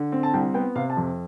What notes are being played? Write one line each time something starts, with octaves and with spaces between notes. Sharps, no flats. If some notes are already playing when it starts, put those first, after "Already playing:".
Already playing: D3
C4
A5
C2 G5
B3 G5
C3 F5
A5
F2